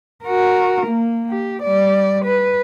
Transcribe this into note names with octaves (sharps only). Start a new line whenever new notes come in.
F#4 A#4
A#3
G4
G3 D5
B4